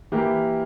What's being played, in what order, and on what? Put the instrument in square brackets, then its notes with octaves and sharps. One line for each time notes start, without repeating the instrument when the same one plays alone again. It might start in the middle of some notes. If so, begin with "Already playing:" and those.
[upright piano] E3 A#3 E4 G4 A#4